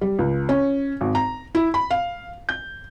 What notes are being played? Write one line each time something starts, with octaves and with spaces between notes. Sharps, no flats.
G3
C#2
C#4
G#1
A#5
E4
B5
F5
G6